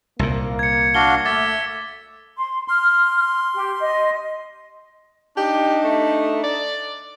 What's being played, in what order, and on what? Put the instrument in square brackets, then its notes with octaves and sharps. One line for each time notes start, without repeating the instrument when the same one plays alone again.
[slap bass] C2 A#2 [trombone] A#3
[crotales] G#6 C#7
[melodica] D4 F#4 F5 [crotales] G7
[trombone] A3 [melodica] E5 [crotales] D6 A6
[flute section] C6
[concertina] C6 [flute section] F6
[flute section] G4
D#5
[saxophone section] D4 D#4 [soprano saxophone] G4
[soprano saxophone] A3
D5